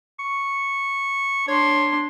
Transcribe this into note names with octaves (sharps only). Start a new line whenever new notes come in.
C#6
D4 C#5 C6